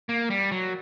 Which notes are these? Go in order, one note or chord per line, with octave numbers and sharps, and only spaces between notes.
A#3
G3
F#3